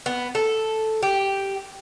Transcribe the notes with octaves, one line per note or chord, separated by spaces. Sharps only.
B3
A4
G4